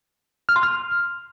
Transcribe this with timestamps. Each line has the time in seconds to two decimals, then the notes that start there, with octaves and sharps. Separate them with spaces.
0.49 F6
0.56 C6
0.63 F6